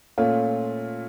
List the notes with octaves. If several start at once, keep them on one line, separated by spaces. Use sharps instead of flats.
A#2 A3 C#4 F4